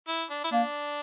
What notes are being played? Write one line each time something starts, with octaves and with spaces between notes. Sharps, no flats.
E4
D4
E4
A#3 D4